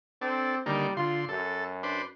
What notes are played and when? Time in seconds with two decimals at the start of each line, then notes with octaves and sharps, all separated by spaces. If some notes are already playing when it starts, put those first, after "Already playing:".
0.22 C4 D4 A4
0.66 D3 D#3 G3 A#3
0.97 D3 F4 C6
1.29 F#2 A4
1.83 D4 B4 C5